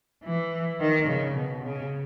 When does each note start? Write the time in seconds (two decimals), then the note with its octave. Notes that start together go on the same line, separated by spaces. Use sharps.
0.24 E3
0.80 D#3
1.08 C#3
1.36 B2
1.64 C#3